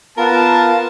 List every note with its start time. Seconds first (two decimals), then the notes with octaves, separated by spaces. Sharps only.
0.18 B3 F4 A#4 A5